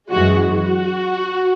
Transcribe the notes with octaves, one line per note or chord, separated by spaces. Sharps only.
F#2 E3 G#3 F#4
F#4